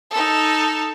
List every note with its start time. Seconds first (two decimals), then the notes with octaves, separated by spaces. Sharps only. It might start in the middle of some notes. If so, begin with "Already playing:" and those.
0.11 D#4 A4